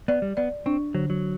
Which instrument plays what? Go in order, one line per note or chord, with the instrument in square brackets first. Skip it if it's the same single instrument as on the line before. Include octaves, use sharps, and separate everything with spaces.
[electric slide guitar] B3 [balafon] D5
[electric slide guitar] G3
[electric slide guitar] B3 [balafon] D5
[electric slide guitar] C4 [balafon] D4
[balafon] D3 [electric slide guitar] F#3
[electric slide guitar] F#3